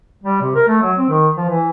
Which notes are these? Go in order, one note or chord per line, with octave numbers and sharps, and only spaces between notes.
G3
C3
A#4
A3
F#3
C4
D#3
F3
E3